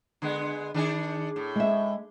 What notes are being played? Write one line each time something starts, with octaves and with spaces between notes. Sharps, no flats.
D3 G#3 B3
D#3 D4 G#4
A2
G#3 E5